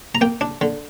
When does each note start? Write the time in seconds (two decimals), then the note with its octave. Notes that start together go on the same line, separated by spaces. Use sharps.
0.15 A#5
0.21 A#3 G5
0.41 D4
0.61 D3